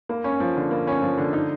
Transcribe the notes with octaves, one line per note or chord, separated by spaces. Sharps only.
A#3
C#4
F3
D3
A#3
C#4
F3
D3
D#4